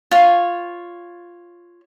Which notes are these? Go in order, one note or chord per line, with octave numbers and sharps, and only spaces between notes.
F4 C#5